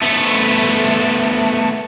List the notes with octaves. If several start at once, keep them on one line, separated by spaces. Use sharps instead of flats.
A3 B3